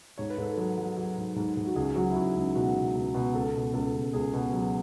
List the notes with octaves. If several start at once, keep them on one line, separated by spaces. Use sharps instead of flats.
G#2 C#5
B4
G#2 A4
F#3 B4
F#3
F#3
G#2
G#2
G#2
F#4
C#2 G#4
F#3 F#4
E4
C#2 F#4
C#2
B2 F#4
B2
C#2
B2
C#2 A4
B2
C#2 A4
C#2
C#2 G#4
B2
F#3